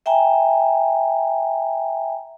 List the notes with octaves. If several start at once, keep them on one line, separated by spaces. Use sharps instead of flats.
E5 G5 G#5 A#5